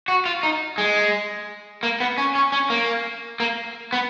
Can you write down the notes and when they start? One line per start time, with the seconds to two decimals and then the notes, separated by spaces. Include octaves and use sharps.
0.08 F#4
0.26 F4
0.43 D#4
0.78 G#3
1.83 A#3
2.00 B3
2.18 C#4
2.35 C#4
2.52 C#4
2.70 A#3
3.40 A#3
3.93 B3